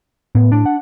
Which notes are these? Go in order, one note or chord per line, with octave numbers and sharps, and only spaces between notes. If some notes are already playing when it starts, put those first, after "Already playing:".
A2 B3
A2 D4
F#5